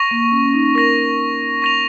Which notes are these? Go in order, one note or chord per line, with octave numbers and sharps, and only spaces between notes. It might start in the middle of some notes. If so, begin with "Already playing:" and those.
Already playing: C#6 A#6 F7
A#3
C#4
C#4
D#4
A#4 C#6 A#6 F7
C#6 A#6 F7